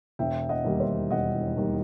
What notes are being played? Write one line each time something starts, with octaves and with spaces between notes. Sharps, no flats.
E1 E5 G5
D#5 F#5
D#2 D#3 G3
C5 E5
E1 D#5 F#5
D#2 D#3 G3